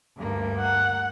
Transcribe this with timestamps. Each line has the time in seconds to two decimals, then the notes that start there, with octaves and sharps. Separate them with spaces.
0.16 D2 G2 A#3
0.61 F#5